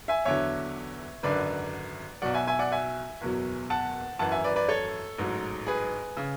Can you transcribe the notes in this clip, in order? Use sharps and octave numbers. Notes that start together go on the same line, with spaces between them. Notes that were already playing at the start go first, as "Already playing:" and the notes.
E5 G#5
E2 D3 F#3 C#5 E5
G#1 F#2 D3 B4 D5
B1 B2 F#3 D5 F#5
E5 G#5
E5 G#5
D5 F#5
E5 G#5
F#1 E2 B2 F#3
F#5 A5
G#1 F#2 E3 F#5 A5
E5 G#5
B4 D5
B4 D5
A4 C#5
A1 G#2 F#3
G#4 B4
C#3